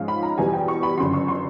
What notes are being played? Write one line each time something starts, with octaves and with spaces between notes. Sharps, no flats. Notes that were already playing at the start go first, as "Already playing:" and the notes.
Already playing: G#2 F3 G#3 C#4 F4
B5
A#5
E2 B2 G3 G#5
G5
C#6
B5
G1 F#2 C#3 C6
C#6
C6